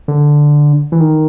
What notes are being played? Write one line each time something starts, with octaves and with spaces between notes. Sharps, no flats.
D3
E3
D#3